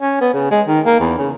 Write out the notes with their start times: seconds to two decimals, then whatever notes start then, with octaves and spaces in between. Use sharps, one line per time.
0.01 C#4
0.21 B3
0.34 C#3
0.51 G#3
0.68 D#3
0.86 A#3
1.00 E2
1.18 C#3